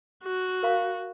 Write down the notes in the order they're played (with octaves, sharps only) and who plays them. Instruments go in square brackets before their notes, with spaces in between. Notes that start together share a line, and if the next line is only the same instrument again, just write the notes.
[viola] F#4
[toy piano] A#4 F5 B5